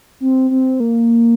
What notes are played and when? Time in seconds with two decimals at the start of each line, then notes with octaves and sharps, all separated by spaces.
0.20 C4
0.51 C4
0.80 A#3